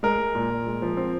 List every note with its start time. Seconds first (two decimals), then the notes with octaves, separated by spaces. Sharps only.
0.03 G#3 A#4
0.18 G#3
0.35 A#2
0.50 A#2
0.66 G#3
0.82 F3
0.97 C4